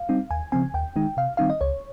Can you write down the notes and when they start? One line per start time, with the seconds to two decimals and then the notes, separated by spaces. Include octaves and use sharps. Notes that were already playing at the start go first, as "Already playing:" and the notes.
Already playing: F5
0.09 G3 C4 D#4
0.31 D#2 G#5
0.52 C#3 F3 C4 G#5
0.74 D#2 G5
0.96 D#3 G#3 D#4
1.17 C3 F5
1.37 D#3 G3 C4 D#4 F5
1.50 D#5
1.61 C#2 C#5